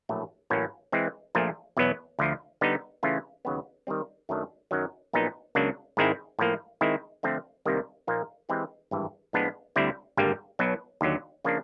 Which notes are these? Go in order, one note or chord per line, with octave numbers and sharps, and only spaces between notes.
A#1 A2 F#3 A3
A1 A2 F#3 A#3 C#4
E3 G#3 C4
A#1 A#2 F3 A3
E2 B2 F#3 B3
D2 D3 F3
D3 G3 B3 D#4
C#3 E3 A3 C#4 F4
D#2 C#3 F#3 B3
D#3 G3 C4
F#2 D#3 F#3 A3 D4
F#2 D#3 F#3
A#1 A#2 F#3 B3 D#4
C#2 C#3 F#3 A#3 D4
G#2 D#3 G#3 C4 E4
A2 F3 A#3
D#3 G#3 C4 E4
D3 F3 A3 C4
C2 C3 D#3 G3 A#3
A#2 F3 A#3 D#4
E3 G#3 C4 E4 G4
G#1 G2 E3
A2 F3 G#3 B3 D4
D2 D3 G3 C4 E4
G#1 G2 D3 G3 A#3
B1 B2 F#3
D#2 D3 F#3
C#3 F3 A#3 D4